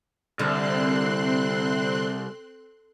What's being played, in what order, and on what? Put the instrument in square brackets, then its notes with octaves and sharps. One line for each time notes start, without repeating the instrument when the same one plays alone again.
[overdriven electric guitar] C2 [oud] D3 [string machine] C4 C6 F#6